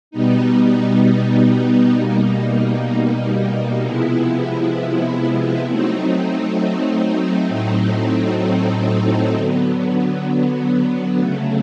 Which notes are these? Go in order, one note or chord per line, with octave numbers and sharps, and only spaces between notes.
B2 G3 B3 D#4
B2 G3 A#3 D#4
C3 F3 G#3 B3 E4
F#3 A3 C4 D#4
A2 F#3 A3 C4 D#4
D3 F#3 B3
C#3 F#3 A3